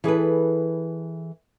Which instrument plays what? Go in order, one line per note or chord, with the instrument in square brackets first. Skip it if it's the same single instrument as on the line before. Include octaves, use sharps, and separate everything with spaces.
[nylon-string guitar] E3 G#4 A4 B4